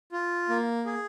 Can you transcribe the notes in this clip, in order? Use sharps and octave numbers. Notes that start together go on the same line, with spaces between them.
F4
A#3
G#4